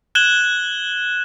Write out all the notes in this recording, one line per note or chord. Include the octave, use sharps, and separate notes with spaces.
F#6 G#6 E7 F#7 G7